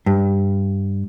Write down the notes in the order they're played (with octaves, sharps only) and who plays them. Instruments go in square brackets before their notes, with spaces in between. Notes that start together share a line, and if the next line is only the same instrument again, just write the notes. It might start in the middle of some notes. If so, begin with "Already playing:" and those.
[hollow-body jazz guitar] G2